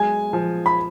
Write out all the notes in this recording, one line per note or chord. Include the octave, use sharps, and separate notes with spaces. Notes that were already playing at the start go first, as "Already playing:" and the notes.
Already playing: F#3 G#3 G#5
F3
B5